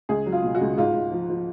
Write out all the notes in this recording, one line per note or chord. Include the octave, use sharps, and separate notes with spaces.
C#2 G#4
F#3
F4
B2
F#4
C#2
G#2 F4
G#2
F3
F3